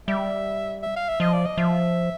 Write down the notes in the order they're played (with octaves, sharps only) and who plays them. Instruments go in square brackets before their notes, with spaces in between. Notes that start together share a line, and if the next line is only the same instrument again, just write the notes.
[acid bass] G3 [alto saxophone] E5
[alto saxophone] E5
F5
E5
[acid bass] F3 [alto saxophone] D#5
[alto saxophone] D5
D#5
[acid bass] F3 [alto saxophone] E5